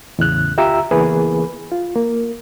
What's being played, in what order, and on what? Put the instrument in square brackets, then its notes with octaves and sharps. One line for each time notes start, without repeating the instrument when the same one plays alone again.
[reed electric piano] E2 A2 C#3 F#6
D2 F4 G4 E5 A#5 E6
C#2 E3 A#3 B3 G#4 B4
F4
A#3